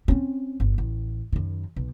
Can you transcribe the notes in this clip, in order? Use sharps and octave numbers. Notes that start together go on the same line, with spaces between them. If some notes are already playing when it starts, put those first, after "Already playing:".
C4 C#4
G1
A1
F#2 D#3
B1